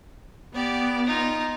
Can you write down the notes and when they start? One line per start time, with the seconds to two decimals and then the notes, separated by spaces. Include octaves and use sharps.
0.55 B3 G4 D5
1.06 D#4 F4